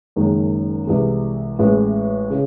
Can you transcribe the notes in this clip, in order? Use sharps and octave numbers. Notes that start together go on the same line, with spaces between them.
F#1 F#2 D#3 G#3
C2 C3 E3 G#3
A1 A2 G#3
C#3